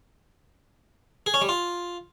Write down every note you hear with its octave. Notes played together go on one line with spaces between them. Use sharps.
G#4
C#4
G3
F4